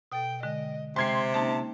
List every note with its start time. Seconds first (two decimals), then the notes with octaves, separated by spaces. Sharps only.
0.12 B2 A4 G5
0.43 D3 G#3 D#5
0.96 C3 G#3 G5 C6 G#6 C7
1.34 A#3 C#4 D#4 A5